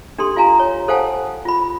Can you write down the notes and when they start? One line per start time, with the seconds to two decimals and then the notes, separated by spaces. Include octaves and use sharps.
0.18 D4 G4 A4 C6
0.36 F4 F5 G#5 A#5
0.59 C#5
0.88 A4 C5 F5 F#5 G#5 A5
1.45 F4 B5